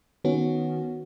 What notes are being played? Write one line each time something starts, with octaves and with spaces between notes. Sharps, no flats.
D#3 B3 C#4 F#4